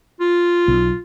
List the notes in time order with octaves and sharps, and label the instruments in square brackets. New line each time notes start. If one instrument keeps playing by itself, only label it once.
[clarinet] F4
[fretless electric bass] B1